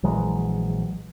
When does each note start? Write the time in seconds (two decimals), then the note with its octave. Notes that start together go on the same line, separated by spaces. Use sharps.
0.03 A#1 E3 F#3 G#3